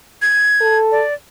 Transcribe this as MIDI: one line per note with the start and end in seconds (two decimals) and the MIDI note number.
0.22 0.77 92
0.61 1.03 69
0.92 1.14 74